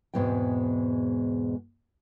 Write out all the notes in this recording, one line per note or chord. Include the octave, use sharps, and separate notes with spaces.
E2 G#2 B2 G#3 C4 G5